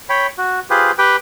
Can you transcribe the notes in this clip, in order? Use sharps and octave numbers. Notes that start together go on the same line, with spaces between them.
C#5 G5 B5
F#4
F4 G4 G#4 B4 C5
G4 B4 G5